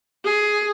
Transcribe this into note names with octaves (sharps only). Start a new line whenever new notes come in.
G#4